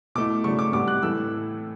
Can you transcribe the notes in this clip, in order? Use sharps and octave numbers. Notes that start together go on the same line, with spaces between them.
B2 A3 E4 D6
C#3 F#3 A3 D4 C#6
D6
A2 G3 B3 D4 D6
F#6
A2 E3 A3 E4 E6